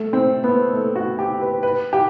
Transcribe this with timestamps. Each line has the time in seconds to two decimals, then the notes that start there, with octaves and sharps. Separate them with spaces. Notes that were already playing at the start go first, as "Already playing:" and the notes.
Already playing: A3
0.13 C4
0.44 B3
0.73 A3
0.96 F#4
1.19 G4
1.41 B4
1.63 B4
1.93 G4